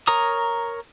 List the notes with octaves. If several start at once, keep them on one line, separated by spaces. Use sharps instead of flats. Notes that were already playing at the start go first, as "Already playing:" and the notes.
A#4 C#5 A#5 D#6